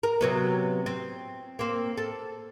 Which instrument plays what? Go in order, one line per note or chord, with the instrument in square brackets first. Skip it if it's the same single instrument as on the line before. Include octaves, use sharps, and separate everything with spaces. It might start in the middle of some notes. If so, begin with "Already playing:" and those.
[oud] A#4
C3 F#3 B3
C4
A#3 C4
A4